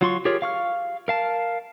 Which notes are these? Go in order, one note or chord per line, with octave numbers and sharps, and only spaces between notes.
F#3 F4 C6 C#6
F4 G4 G#4 A#4 C#5
F5 C#6 F6
A#4 F5 A5